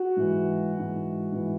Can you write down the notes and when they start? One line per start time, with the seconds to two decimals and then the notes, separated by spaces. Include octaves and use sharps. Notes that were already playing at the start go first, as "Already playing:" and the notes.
Already playing: F#4 F#5
0.17 G#2 E3
0.74 G#2 E3
1.32 G#2 E3